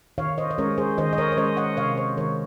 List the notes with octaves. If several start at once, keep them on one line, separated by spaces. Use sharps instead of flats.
D#3 C#5 F5
C5 D#5
D#5
G#3 C#4 A#4 C#5
G#4 C5
D#3 C5 D#5
D#5
A#4 C#5
C#5
G#3 C#4 C5 D#5
D#5 F#5
C3 C#5 F5
C5 D#5
D#3 G#3 A#4 C#5